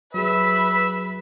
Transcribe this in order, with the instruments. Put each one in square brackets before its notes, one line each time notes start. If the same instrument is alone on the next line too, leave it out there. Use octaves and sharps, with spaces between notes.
[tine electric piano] F#3 F#4 G#4 [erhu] B4 [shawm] E5